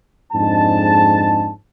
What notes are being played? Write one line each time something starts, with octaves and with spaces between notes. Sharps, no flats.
F2 G#2 G#3 D4 A5